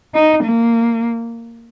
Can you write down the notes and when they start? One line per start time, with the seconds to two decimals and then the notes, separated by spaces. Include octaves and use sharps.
0.14 D#4
0.43 A#3